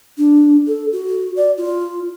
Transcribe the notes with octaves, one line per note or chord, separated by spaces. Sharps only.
D4
A4
F#4
D5
F4